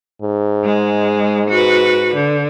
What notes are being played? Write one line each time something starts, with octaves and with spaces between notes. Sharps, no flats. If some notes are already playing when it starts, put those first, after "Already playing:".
G#2
G#3
F#4 B4
D3